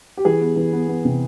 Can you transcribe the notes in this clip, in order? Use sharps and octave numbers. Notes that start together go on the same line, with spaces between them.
G4
E3 G#4
B3
E3
B3
B3
C3